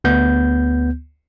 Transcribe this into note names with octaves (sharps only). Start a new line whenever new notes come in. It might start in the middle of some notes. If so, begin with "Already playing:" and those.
D2 B3 G6